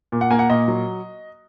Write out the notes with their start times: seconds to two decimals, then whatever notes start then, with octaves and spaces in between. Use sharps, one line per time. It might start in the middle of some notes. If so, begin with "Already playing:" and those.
0.12 A#2
0.21 F#5
0.30 A#3 G#5
0.39 F#5
0.50 A#2 D#5
0.68 F#3